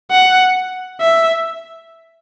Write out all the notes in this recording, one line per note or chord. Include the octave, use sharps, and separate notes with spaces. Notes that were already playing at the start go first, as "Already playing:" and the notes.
F#5
E5